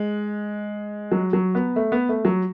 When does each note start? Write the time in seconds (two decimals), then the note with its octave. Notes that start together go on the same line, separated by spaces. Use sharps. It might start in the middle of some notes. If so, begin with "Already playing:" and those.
Already playing: G#3
1.12 F#3
1.33 F#3
1.55 B3
1.76 A3
1.92 B3
2.09 A3
2.25 F#3